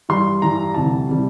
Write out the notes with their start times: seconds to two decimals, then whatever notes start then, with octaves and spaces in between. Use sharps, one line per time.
0.09 G2 E3 G3 C6
0.42 G2 E3 G3 A#5
0.74 D2 C3 E3 G3 A5
1.09 C3 E3 G3